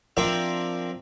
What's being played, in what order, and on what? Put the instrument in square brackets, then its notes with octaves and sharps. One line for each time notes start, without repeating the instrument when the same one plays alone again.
[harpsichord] F3 C4 D4 A#4 E5